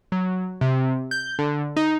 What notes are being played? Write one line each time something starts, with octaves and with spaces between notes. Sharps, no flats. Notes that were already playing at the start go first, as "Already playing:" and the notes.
F#3
C3
G6
D3
D#4